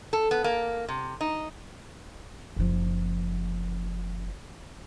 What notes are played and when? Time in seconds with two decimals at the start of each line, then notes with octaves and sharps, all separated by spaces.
0.13 A4
0.31 B3
0.44 A#3
0.88 C3
1.21 D#4
2.56 F#1 F3